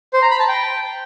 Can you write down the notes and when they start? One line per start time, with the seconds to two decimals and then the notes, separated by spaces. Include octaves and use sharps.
0.13 C5
0.22 A#5
0.31 B5
0.39 A5
0.48 G5